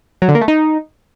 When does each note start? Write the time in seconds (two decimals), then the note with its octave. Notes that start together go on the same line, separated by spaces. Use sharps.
0.22 F#3
0.28 D3
0.35 A#3
0.41 A3
0.48 D#4